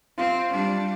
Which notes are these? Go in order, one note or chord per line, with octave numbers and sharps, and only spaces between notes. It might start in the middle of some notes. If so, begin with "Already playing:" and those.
C4 F4 E5
G3 D4